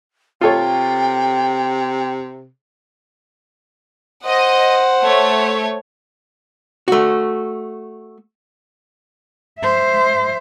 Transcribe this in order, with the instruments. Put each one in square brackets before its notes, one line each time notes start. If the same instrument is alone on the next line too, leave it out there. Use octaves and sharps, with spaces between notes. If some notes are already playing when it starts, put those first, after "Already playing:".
[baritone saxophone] C3 [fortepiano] F4 A4 C#5 [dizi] G5
[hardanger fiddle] C5 F#5 [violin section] D#5
[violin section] A3 C#5
[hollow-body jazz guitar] A3 F#4
[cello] C5 E5